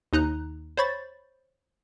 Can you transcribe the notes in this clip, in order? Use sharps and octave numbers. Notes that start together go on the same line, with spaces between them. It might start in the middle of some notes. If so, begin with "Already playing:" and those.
D#2 D#4 A#5 F#6
C5 C#5 B5 C#6 A6